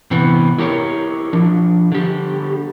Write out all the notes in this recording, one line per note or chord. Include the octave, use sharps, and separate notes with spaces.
C3 E3 B3
E4 G4 A#4 C#5
F3 D4
D3 G4